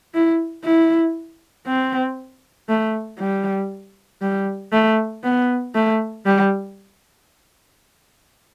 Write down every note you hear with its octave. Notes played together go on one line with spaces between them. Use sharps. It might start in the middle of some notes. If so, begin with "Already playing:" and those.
E4
E4
C4
A3
G3
G3
A3
B3
A3
G3